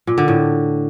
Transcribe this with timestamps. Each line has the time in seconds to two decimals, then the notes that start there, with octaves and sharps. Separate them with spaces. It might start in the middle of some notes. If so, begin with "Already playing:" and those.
0.07 A#2
0.18 D3
0.28 A2